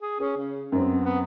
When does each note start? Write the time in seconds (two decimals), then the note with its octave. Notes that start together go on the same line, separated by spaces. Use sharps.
0.02 G#4
0.20 C#4 G#4
0.37 C#3
0.72 F#2 B3 C4
1.05 B3